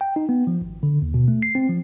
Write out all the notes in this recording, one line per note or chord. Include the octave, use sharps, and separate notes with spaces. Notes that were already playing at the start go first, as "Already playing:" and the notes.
G5
D#4
B3
F3
G#1
D3
D#2
B2
A3
C7
C4
F3